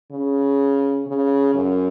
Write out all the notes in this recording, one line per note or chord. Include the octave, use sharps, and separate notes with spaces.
C#3
C#3
F#2